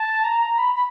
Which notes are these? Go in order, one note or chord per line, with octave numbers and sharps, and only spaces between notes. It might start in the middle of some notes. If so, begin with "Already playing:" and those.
Already playing: A5
A#5
B5
B5